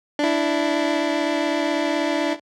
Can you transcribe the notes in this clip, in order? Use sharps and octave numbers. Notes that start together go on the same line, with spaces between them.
D4 E4